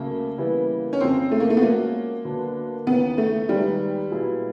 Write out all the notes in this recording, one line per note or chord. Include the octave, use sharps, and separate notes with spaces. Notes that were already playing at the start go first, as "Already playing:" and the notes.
Already playing: C#2 C#3 F#3 A3 A#3
C#3 E3 G3 B3 E4
C#4
F2 C#3 F3 C4
A3
A#3
A3
B3
F3 G#3 A#3 C#4 F#4 A#4
D2 D3 F#3 B3 D4
D#2 C#3 E3 B3
A3
D#2 D#3 G3 G#3 B3
A#2 F#3 B3 E4 G#4